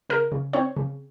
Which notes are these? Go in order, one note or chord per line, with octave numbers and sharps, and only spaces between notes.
C#3 A#4
C#3
C4 C#5
C#3